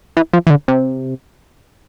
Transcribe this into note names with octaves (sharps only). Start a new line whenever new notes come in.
E3
F3
E3
D3
C3